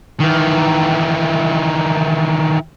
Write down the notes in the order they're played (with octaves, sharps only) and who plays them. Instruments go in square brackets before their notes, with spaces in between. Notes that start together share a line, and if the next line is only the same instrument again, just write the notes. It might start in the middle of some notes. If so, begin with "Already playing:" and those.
[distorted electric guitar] D#3 E3